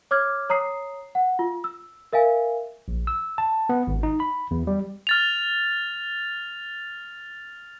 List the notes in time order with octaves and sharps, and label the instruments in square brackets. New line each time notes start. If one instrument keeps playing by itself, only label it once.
[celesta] C#5 D6 F6 G#6
C#5 A#5 D#6 C7
F#5
F4
E6
A#4 E5 F5 G#5
[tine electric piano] A#1
E6
A5
B3
G#1
D#4
B5
E2
G3
[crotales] F6 A6 F7